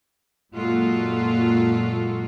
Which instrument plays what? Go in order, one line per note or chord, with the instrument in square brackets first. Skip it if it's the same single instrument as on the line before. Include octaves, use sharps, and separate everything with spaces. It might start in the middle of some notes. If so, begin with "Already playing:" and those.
[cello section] F#2 A#2 G#3 F4 F#4 A4